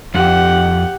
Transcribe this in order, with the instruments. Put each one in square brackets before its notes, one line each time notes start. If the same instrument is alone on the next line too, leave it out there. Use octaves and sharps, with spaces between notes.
[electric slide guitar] F2 [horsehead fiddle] G4 F#5